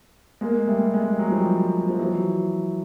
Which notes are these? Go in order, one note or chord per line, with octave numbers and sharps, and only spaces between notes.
G#3 A#3
G3 A3
G#3
G3
F#3
F3 G3
F3
E3 F#3